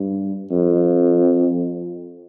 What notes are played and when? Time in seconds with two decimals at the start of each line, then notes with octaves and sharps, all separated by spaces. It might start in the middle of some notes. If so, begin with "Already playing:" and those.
Already playing: G2
0.51 F2